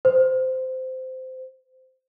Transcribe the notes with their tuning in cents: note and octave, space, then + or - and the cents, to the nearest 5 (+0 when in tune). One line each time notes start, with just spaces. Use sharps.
C5 -15